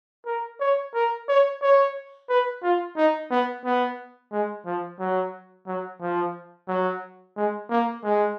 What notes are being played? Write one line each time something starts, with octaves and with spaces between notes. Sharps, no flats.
A#4
C#5
A#4
C#5
C#5
B4
F4
D#4
B3
B3
G#3
F3
F#3
F#3
F3
F#3
G#3
A#3
G#3